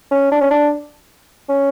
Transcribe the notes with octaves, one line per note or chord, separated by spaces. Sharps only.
C#4
D4
C#4
D4
C#4